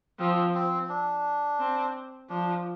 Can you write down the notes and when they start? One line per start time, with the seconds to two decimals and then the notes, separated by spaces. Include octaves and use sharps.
0.19 F3 C4
0.54 C4
0.89 D4
1.59 C4
2.29 F3 D4